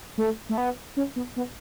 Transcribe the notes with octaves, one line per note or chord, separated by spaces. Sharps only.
A3
A3
B3
C#4
B3
B3